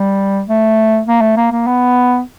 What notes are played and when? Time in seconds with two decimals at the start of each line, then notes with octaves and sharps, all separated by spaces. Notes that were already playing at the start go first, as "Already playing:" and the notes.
Already playing: G3
0.47 A3
1.07 A#3
1.21 A3
1.37 A#3
1.52 A#3
1.67 B3